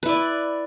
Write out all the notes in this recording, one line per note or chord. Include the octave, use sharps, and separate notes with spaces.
E4 B4 D5